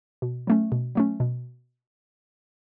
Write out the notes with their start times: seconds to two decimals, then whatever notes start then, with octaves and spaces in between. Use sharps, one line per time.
0.22 B2
0.47 F#3 A3 C#4
0.72 B2
0.95 F#3 A3 C#4
1.20 B2